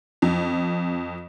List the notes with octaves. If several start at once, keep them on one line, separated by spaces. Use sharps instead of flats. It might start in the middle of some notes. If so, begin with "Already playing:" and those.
F2